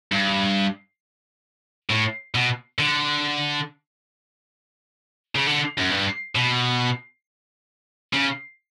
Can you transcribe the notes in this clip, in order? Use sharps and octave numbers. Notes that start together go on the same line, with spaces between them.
G2
A2
B2
D3
C#3
D3
F#2
G2
B2
C#3